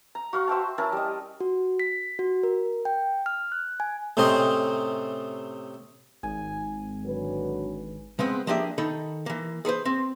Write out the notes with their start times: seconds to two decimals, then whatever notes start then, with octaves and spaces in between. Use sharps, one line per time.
0.15 A#5
0.33 F#4 F5 C#6
0.48 C5 E5 G5 A5
0.78 C#4 E4 A#4 A5
0.92 G3 D#5
1.40 F#4
1.79 B6
2.19 F#4
2.43 A#4
2.85 G5
3.26 F6
3.52 F#6
3.80 G#5
4.17 A2 C3 C4 C#4 C5 D#5
6.23 G#1 G#5
7.05 D3 F#3 B4
8.19 C#3 G#3 B3 C4
8.47 F3 A#3 D4 G4 G#4 E5
8.78 D#3 D#4 A4 B5
9.26 E3 A#3
9.65 G#4 A4 B4 C5
9.85 C4